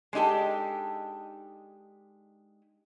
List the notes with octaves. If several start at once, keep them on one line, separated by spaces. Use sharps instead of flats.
G#3 D4 D#4 G4 A4